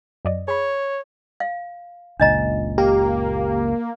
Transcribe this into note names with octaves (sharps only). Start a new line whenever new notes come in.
F#2 D5 D#5
G#4 C#5 B5
F5
F#1 C#2 A#2 D4 D#5 A#5
A#3 G4